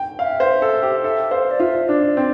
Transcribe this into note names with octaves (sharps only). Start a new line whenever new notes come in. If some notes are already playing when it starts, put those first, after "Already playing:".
Already playing: G5
E5 F5
C5
A4
G4
A4 E5
C5 F5
D5
F4 E5
D4 D5
C4